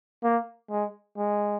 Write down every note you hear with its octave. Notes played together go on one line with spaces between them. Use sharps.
A#3
G#3
G#3